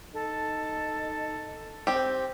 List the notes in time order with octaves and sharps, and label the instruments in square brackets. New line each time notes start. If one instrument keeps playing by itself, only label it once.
[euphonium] D#4 [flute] A4
[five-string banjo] C4 G4